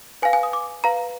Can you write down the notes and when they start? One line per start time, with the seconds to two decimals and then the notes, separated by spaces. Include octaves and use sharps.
0.22 B4 F5 G#5
0.33 G#5
0.43 D#6
0.53 D6
0.84 B4 F5 A#5